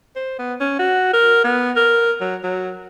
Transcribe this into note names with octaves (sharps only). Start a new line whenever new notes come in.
C5
B3
C#4
F#4
A#4
B3
A#4
F#3
F#3